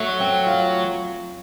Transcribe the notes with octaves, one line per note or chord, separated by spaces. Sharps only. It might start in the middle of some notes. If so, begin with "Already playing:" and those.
Already playing: F#3 A3
C4
F4